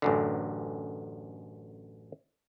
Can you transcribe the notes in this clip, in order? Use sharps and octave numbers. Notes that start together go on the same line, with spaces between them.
A1 F#2 D3